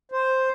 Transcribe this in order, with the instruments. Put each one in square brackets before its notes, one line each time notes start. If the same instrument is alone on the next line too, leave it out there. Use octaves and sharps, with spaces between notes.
[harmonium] C5